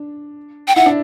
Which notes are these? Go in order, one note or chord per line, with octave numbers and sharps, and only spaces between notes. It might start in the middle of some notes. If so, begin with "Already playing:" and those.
Already playing: D4
G5
E4 F#5
D4